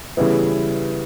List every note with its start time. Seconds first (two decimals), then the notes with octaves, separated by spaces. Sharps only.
0.17 C#3 E3 G3 B3 E4